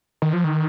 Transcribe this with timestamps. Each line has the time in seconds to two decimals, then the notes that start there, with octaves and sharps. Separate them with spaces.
0.22 D#3
0.33 F3
0.44 D#3